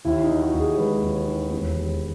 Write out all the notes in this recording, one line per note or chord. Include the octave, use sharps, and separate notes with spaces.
D#2 E4
D#4
D#3
F#4
D#2
G#4
G#3 B4
D#2
D#3
E1
D#2